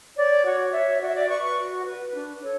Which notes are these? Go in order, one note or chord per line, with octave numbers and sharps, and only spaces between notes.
C#5 D5
F#4 C#5
C#5 E5
F#4 D5
E5
D5
B4 C#6
C#6
F#4
B4
D4
A4 C#5